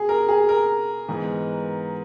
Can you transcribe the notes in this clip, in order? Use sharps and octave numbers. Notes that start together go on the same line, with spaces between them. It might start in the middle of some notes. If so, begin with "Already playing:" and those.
Already playing: B2 G#4
A#4
G#4
A#4
G#2 E3 B3